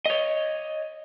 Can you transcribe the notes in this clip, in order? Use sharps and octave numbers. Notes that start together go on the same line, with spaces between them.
C#5 D#5